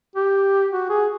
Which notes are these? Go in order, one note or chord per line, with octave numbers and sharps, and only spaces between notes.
G4
F#4
G#4